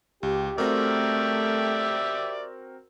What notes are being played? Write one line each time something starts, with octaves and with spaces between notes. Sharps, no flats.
C#2 G4
A3 C4 F#4 G4 A#4 D5 E5